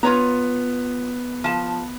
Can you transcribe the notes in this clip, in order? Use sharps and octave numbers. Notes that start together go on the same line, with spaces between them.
B3 F4 C#5 A#5
F3 A5